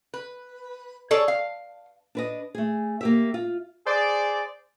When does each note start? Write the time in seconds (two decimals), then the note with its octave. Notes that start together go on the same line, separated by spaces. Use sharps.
0.14 B4
1.11 G#4 A4 C#5 D5
1.28 F5
2.15 D4 B4 D#5
2.55 A3 G#4
3.01 A#3 G4 E5
3.34 F4
3.87 G#4 C5 D5